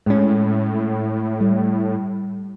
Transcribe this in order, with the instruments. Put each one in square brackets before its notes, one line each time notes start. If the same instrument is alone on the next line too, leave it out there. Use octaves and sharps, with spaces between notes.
[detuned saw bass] A2 [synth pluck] G#3 C#4
[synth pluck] G3